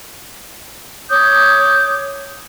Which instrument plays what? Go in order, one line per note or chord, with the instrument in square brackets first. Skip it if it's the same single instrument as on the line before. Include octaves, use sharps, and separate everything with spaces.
[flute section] C#5 D6 D#6 G6